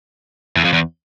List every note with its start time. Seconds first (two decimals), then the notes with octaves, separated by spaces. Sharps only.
0.56 E2
0.64 F2
0.73 E2